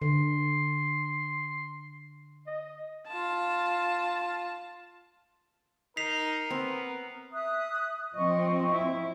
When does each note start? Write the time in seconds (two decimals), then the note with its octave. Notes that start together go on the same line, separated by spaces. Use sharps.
0.02 D3 C6
2.47 D#5
3.08 F4 A5
5.97 D#4 A#4 B6 C7 F7
6.50 B3 C4
7.33 E5 D#6 F#6
8.15 F3 C4 D#5 C#6
8.72 E4